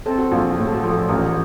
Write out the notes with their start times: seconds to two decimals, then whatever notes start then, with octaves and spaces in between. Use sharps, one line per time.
0.06 C4 A4
0.18 F#4
0.32 A#1 F4
0.45 F4
0.57 A2 F4
0.67 A4
0.74 F#4
0.83 F3
0.92 A4
1.09 A1 A#4